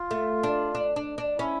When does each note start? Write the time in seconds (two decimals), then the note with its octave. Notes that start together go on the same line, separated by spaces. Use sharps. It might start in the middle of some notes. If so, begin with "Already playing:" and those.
Already playing: F4
0.11 A3
0.43 D4
0.75 D4
0.96 D4
1.18 D4
1.39 C#4 E4